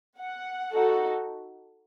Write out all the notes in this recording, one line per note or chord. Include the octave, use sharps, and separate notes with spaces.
F#5
D#4 F#4 A4